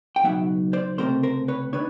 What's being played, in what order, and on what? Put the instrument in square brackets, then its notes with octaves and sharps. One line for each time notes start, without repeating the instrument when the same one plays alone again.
[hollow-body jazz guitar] G5
C#2 B2 F#3 B3 D#4 E5 F#5
C5 D5
C#2 C3 F3 A3 C4 A#4 C5
A#4 C5
B4 C#5
D#3 B3 D4 B4 C#5